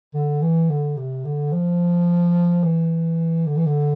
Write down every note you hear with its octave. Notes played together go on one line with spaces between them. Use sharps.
D3
E3
D3
C3
D3
F3
E3
D3
E3
D3